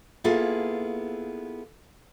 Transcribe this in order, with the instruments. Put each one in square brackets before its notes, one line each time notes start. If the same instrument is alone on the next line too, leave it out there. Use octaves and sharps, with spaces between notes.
[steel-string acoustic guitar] A#3 B3 E4 F4 G#4 A4